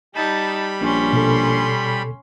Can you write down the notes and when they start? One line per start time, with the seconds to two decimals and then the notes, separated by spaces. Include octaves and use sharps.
0.15 G3 D#4 A5 B5
0.81 A#1 C#4 C6
1.13 B2 A4